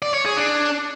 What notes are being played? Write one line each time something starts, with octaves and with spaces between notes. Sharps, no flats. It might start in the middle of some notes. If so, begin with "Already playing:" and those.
D5
C#5
G#4
D4